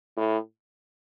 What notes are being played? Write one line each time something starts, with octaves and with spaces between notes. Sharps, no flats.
A2